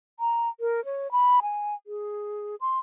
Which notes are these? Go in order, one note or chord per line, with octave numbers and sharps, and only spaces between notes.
A#5
A#4
C#5
B5
G#5
G#4
C6